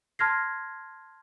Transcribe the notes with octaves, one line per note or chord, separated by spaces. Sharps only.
A5 C6 F6 G#6 A#6 C7